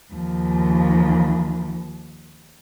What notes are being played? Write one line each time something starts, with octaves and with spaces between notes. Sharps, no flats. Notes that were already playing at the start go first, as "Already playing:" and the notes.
D#2 F3